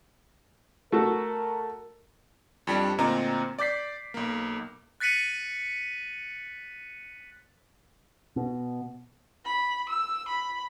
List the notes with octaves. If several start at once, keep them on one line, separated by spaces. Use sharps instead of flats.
A3 F#4 A4 A#4
F2 G3 D4
D2 A#2 C4 D#5 A#5
D5 D6 G6 B6 C7
B1 A#3
F#6 A6 B6 C#7 D#7 F#7
B2
B5
E6
B5